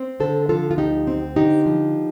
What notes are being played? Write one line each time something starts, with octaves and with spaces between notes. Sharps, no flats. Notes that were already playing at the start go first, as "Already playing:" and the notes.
Already playing: C4
D3 A4 C5
F3 F4 A4
F4
D2 D#4 G4
C4
D3 D#4 G4
F3